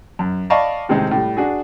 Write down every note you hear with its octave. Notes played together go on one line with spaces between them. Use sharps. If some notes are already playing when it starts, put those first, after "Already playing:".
F#2
D5 D#5 F5 A5 B5 C#6
A2 C3 D#3 G#3 C4 D#4
A2 G3
D4 F#4 G#4